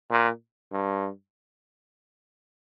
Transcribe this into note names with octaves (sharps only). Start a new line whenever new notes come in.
A#2
G2